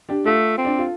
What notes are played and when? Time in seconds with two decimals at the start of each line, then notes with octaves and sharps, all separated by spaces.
0.09 D4 G4
0.25 A3 F4 A4
0.58 C4
0.65 D4
0.78 F4